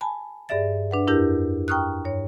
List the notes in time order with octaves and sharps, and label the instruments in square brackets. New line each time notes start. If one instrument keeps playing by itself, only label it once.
[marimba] G#5 A5 B5
G2 G#4 D5 E5 A6
D4 B4 F#5
F2 D4 E4 G4 A#4 G6
G5 A#5 C#6 D#6 F6 F#6
G2 C#5